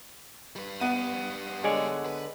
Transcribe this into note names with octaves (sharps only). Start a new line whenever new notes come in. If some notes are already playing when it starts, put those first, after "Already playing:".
G3 B4
B3 D#7
D3 G#3 C#5 D5
B4